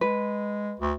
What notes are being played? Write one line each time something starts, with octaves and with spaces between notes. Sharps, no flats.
G#3 B4
D2